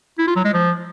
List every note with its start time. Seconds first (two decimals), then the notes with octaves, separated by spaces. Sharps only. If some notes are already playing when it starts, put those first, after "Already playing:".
0.18 E4
0.27 F4
0.36 F#3
0.45 G#3
0.54 F3